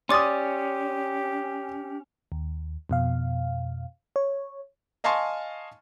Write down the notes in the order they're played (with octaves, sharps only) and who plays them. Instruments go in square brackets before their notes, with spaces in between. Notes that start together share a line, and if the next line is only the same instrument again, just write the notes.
[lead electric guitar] C#4 [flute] G4 [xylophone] D5 D6 A6 [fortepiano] C6 D#6
[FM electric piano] D#2
F2 B2 F5
C#5
[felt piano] D#5 F5 G#5 A5 C6 C#6